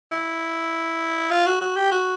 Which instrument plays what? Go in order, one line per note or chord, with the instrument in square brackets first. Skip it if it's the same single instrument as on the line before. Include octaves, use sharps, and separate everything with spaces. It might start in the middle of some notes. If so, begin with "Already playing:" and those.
[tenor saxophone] E4
F4
F#4
F#4
G4
F#4